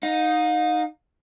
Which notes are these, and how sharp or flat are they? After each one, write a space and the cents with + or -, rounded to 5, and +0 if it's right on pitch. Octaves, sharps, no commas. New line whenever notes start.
D#4 +0 F5 +45